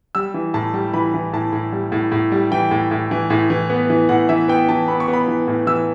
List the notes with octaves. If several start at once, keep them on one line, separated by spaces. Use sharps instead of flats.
G3 E6
E3
A2 A5
G3
E3 B5
E3
A2 A5
A2
G3
A2
A2
G3
E3 G5
A2
A2
E3
A2
E3
B3
E3
A2 F#5
E3 E5
B3 G5
E3 A5
B3 B5
C#6
B3
B5
E3
A2
E3 E6